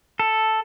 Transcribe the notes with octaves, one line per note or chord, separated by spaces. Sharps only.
A4